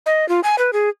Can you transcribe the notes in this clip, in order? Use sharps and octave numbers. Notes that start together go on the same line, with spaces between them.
D#5
F4
G#5
B4
G#4